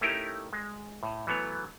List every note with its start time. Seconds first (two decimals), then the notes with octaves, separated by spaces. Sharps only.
0.01 A3 C#4 D#4 E4 G4 A#4
0.53 G#3
1.03 A2
1.27 E3 F#3 A3 B3 C#5